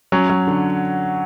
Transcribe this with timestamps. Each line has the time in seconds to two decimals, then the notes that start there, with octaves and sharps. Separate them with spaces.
0.12 F#3 C#4
0.30 F#3
0.47 D3